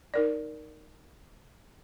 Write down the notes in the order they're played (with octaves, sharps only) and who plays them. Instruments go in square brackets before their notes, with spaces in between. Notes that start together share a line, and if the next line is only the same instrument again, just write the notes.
[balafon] D#4 A#4 D5